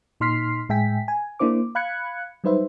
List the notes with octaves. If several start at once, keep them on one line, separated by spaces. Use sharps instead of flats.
A#2 D#4 C6 F6 B6 C7
A2 G#3 E5 G5 G#5 B6
G#5
A#3 D4 E4 C5 D6
F5 B5 F#6 G#6 C#7
F#3 G3 D#4 B4 C5 E5